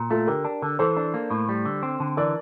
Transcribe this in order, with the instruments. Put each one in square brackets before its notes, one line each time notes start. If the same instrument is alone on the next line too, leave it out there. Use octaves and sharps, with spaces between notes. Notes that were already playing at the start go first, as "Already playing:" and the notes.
Already playing: [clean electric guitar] A#2
[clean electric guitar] A3 [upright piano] F4 A4
[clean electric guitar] D3 [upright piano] G4 A#4
[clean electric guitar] D4
D3
[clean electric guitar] E3 [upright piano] A4 C5
[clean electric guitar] D4
A#3
A2
G3
D3
C4
D3
[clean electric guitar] E3 [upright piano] A#4 D5